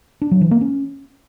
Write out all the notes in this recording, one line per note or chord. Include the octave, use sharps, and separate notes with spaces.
D4
F#3
E3
A#3
C#4